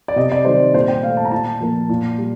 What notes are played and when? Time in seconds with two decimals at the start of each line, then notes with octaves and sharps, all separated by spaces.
0.08 D5
0.16 C3 D#5
0.32 D5
0.45 D#3 G3 C5
0.74 A#2 C5
0.88 G5
1.03 A3 F5
1.17 A5
1.25 A#5
1.31 A#2 A5
1.61 F3 A#3
1.89 A#2
2.18 G3